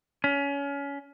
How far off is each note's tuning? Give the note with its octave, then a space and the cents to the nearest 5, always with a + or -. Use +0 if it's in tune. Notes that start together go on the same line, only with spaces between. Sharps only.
C#4 +25